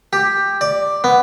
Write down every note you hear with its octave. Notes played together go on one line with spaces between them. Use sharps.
G4
D5
B3